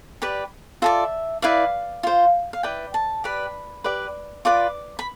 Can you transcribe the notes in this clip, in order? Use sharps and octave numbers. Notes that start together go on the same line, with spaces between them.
G4 B4 D5
F4 A4 D5 E5
E4 B4 D5 F5
F4 C5
F5
E4 B4 D5 G5
A5
G4 B4 D5 B5
G4 B4 D5
F4 B4 D5 D6
B5